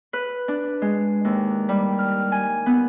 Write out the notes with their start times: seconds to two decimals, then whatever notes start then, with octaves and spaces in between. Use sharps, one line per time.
0.13 B4
0.48 D4
0.82 G#3
1.25 D#2
1.69 G3
1.99 F6
2.32 G#5
2.66 B3